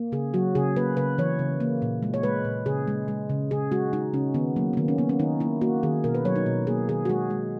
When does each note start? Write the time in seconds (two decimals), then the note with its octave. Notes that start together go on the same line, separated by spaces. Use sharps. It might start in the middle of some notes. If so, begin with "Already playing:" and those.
Already playing: A#3
0.12 C#3 G#4
0.34 F#3 F#4
0.55 C#3 G#4
0.76 A#3 B4
0.97 C#3 B4
1.18 E3 C#5
1.39 C#3
1.60 A#3
1.82 A#2
2.03 G#3
2.14 C#5
2.23 G#3 B4
2.45 A#2
2.66 C#3 G#4
2.87 G#3
3.08 G#3
3.30 C#3
3.51 C#3 G#4
3.72 G#3 F#4
3.93 G#3 D#4
4.14 C#3 C#4
4.34 D#3 B3
4.56 F#3 A#3
4.73 A#3
4.77 D#3 B3
4.88 C#4
4.98 A#3 B3
5.09 C#4
5.19 D#3 D#4
5.40 A#3 E4
5.61 A#3 F#4
5.83 D#3 G#4
6.04 B2 A#4
6.15 B4
6.25 F#3 C#5
6.36 D#4
6.46 B2
6.67 A#3 G#4
6.89 D#3 G#4
7.05 F#4
7.10 G#3 G#4
7.30 G#3